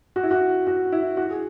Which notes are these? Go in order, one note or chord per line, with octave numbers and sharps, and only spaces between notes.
F#4
E4
F#4
F#4
E4
F#4
G#4